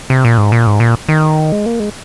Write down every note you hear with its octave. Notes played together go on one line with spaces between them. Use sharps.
C3
A#2
G#2
A#2
G#2
A#2
D#3
G#3
A#3
G#3